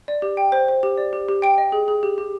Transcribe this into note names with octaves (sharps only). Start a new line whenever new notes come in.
D5
G4
G5
C5
C5
G4
D5
G4
G4
G5 D7
D#5
G#4
G#4
G4
G4